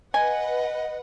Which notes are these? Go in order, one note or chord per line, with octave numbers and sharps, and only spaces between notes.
B4 D#5 F#5 G#5